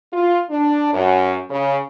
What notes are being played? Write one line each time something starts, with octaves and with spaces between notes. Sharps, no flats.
F4
D4
F#2
C#3